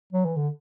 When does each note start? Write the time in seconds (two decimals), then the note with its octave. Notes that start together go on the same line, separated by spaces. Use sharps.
0.13 F#3
0.25 E3
0.36 D3